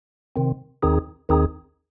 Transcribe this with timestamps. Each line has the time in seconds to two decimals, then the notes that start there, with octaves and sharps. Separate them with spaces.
0.36 C3 D#3 C4
0.83 D#2 D#3 C4 D#4 G#4
1.29 D#2 D#3 C4 D#4 G#4